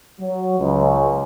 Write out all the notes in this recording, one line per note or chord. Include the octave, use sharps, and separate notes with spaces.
F#3
C#2